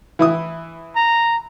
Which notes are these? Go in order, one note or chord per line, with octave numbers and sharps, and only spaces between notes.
E3 E4 D#6
A#5